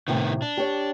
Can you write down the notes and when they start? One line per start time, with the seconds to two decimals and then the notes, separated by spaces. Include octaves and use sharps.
0.08 A2 C3 D#3 B3
0.42 D4
0.57 G4 C#5